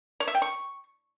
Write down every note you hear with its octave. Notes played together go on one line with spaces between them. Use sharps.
C#5
E5
G5
C#6